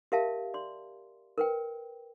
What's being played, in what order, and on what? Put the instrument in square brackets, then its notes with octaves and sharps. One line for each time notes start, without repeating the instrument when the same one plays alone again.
[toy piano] G4 A#4 E5 F5 A5
D5 C6
A#4 B4 G5